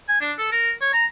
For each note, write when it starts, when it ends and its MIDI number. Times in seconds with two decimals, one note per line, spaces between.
0.08 0.21 80
0.21 0.32 62
0.38 0.51 69
0.52 0.72 70
0.81 0.91 73
0.93 1.05 82